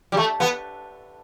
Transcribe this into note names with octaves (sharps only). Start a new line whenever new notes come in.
G3
A3
B3